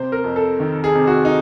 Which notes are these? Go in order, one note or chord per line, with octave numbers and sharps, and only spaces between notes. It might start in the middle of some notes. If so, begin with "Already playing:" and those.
Already playing: C3 C5
A#4
F2
A4
D#3
G#4
C3
F#4
D#4